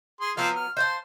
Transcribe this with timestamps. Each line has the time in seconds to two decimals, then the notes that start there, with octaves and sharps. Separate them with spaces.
0.21 G#4 C6
0.37 F3 F#3 B3 C4 F5
0.56 F6
0.77 C5 F5 A5 C6